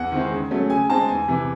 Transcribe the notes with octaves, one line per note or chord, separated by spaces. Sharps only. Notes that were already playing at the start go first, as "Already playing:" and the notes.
Already playing: E2 F#5
D#3 G#3 C4 E4
C#3
F#3 A3 C#4
C#3 G#5
G#3 C4 D#4 A5
E2 G#5
C3 E3